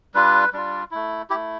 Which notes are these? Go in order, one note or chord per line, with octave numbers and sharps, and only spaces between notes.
G3 D4 F4 B4
G3 D4 F4
A3 E4
A3 E4 G4